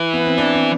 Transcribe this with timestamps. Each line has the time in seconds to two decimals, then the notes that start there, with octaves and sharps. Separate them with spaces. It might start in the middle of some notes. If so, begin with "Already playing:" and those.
Already playing: E3 E4
0.13 B3
0.26 C4
0.38 D4
0.54 C4